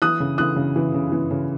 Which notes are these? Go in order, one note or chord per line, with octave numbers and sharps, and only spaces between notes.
E3 D#6 F#6
C#3
E3 D#6 F#6
C#3
E3
C#3
E3
C#3